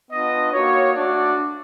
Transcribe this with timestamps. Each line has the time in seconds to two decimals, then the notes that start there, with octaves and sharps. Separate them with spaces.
0.11 B3 D4 F4 D#5
0.52 A#3 D#4 F#4 C#5
0.94 A3 D4 F#4 D5